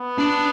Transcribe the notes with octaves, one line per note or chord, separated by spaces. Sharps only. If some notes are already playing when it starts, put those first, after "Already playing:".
Already playing: B3
D4